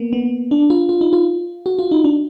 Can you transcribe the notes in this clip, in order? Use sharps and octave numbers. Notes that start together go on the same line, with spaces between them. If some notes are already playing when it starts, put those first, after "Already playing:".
Already playing: A#3 B3
B3
D4
F4
F4
D#4
F4
F#4
F4
D#4
D4